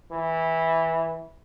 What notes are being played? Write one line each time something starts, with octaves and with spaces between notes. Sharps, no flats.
E3